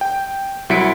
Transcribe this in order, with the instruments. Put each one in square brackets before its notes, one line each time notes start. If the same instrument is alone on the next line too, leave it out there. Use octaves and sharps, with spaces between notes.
[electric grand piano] G5
C2 F#3 E4 B6 C#7 D7